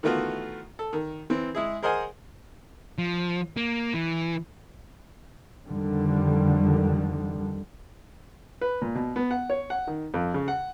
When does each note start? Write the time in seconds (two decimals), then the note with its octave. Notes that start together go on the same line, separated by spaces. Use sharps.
0.03 D#3 E3 A3 B3 F4 F#4
0.79 A4
0.93 D#3
1.30 E3 C4
1.55 G#3 E4 G#4
1.83 G#4 A#4 C5 D#5 F#5 G#5
2.98 F3
3.57 A#3
3.94 E3
5.68 F2 D3 D#3 G3
8.61 B4
8.82 A#2
8.95 B2
9.16 B3
9.31 F#5
9.50 C#5
9.70 F#5
9.87 D#3
10.14 F2
10.34 C#3
10.48 F#5